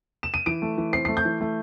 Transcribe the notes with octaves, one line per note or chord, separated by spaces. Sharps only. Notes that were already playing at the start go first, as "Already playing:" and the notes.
E7
D#7
E3 D7
A3
E3
C4 C7
C7
A3
G6
E3
A3